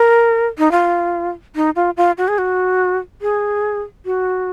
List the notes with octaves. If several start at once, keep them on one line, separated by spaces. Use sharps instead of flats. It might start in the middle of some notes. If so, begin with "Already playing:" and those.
Already playing: A#4
D#4
F4
D#4
F4
F4
F#4
G#4
F#4
G#4
F#4